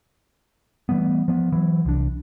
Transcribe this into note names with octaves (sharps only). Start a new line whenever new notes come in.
E3 G3 A3 B3
F3 B3
E3 F#3
C2 D4